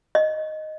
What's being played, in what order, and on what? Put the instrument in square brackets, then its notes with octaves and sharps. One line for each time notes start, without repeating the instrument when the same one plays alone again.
[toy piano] D#5